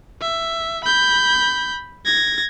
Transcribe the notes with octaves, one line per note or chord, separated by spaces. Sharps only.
E5
B5 G6
G#6 A#6